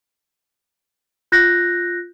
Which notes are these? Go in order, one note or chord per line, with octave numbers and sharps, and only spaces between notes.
F4 F#6 G6 A#6